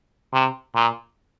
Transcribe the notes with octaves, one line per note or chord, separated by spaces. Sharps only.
C3
A#2